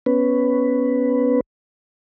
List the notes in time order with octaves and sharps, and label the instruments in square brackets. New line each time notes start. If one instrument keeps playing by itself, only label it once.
[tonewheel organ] B3 C#4 B4